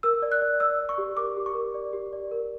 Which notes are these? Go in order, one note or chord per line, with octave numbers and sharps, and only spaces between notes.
A#4 E6
D5
F#6
D5
D5 E6
D5
C#6
G4
A#4 D6
G4
C#6
A#4
D5
G4
D5
A#4